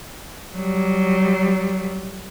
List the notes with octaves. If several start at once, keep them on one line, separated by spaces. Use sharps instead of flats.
F#3 G3